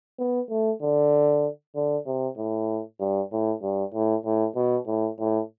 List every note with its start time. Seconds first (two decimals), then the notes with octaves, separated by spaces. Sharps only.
0.19 B3
0.50 A3
0.82 D3
1.76 D3
2.06 C3
2.37 A2
3.00 G2
3.32 A2
3.62 G2
3.94 A2
4.25 A2
4.56 B2
4.87 A2
5.19 A2